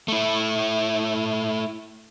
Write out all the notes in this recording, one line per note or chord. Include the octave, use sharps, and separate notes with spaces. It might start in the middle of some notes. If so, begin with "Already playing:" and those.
A3 E4